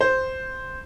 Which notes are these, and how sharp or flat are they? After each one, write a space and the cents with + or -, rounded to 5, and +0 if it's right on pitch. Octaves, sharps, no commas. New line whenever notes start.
C5 -5